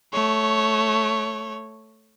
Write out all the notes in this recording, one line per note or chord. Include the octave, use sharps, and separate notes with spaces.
A3 C#5